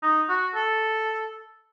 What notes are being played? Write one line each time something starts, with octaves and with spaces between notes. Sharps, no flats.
D#4
F#4
A4